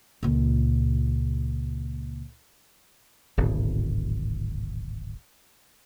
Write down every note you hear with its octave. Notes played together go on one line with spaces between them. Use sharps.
C#2 A#2
D1 G#1 B2